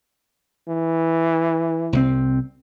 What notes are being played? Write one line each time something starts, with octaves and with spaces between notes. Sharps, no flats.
E3
C2 F#3 C4